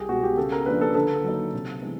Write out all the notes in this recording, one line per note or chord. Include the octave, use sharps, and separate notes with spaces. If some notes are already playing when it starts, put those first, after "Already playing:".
Already playing: C2 G4 G#4
B2 G#3 B3 F#4
G4
C#3 A4
A#4
F3 A#3 D4 B4
A4
D3 A4
F#3 A#3 D#4
C3
E3 G#3 B3